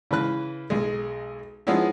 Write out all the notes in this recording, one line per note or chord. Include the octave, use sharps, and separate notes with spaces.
C#3 E3 B4 F#6
B1 G#3
F3 G#3 B3 C#4 D#4 E4